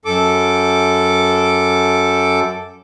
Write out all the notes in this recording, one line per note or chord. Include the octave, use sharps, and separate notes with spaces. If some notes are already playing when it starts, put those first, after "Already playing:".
F#2 A4 D6